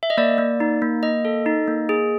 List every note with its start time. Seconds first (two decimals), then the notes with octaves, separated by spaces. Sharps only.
0.03 E5
0.10 D#5
0.17 A#3 D5
0.38 A#3
0.60 D#4
0.82 A#3
1.03 A#3 D#5
1.25 A4
1.46 D#4
1.68 A#3
1.89 G#4